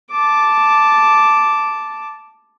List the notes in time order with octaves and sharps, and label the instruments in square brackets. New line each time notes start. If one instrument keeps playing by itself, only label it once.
[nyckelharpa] A5 D6